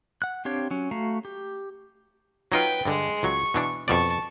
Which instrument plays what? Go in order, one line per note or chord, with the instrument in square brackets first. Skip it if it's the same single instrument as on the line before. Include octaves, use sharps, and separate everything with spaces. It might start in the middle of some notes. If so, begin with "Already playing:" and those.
[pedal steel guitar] F#5 F#6
C4 D4 G4 C#5 F5
F#3 C#4
A3 F#4 F5 A#5
G4
[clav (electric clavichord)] F#3 D#4 F4 [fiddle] B4 G5
[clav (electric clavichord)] G2 D3 [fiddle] G#3
[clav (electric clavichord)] C#2 F#3 [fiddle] C#6
[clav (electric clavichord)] B2 E3 D4
[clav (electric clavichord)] F2 B2 D5 [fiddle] A5 C#6